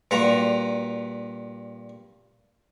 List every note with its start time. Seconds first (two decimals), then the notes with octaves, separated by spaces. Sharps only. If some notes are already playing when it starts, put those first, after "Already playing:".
0.11 G2 A#2 F#4 A#5